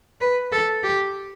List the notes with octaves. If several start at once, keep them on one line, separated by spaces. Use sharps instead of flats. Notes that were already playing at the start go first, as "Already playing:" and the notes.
B4
A4
G4